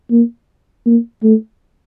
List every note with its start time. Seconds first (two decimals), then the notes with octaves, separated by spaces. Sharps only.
0.11 A#3
0.86 A#3
1.23 A3